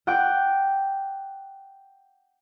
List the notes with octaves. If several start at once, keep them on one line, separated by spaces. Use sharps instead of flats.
F#5 G5 D6 F#6 D7